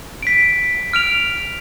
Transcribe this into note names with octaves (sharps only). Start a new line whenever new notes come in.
B6 D7
F6 D7 F7